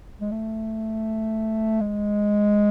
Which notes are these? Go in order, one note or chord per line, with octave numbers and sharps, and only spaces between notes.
G#3
A3
G#3